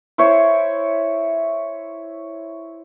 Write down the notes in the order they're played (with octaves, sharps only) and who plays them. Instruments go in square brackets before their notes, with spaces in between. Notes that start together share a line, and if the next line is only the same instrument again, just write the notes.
[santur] E4 C5 C#5